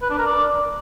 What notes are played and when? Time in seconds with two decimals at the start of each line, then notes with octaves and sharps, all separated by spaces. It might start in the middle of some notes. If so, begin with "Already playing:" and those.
0.02 B4
0.10 D4
0.18 A#4
0.26 D5